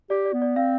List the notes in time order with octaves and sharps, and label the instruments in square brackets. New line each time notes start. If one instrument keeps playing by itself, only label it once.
[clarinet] G4 [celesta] D5
[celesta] D5
[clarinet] B3
[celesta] D5
[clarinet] C4 [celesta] F5